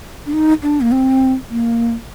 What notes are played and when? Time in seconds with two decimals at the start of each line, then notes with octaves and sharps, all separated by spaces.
0.26 D4
0.33 D#4
0.63 D4
0.81 A#3
0.92 C4
1.50 A#3